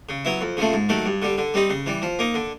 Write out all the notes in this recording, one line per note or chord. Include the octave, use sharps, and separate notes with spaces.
C#3
F#3 B3 E4
F2
C#3 F3 A3
G#2
D#3 F#3 A3
G2
D3 G3
D3
G3 C4 D#4
C#3
E3 G3
F3
A#3 D#4
D3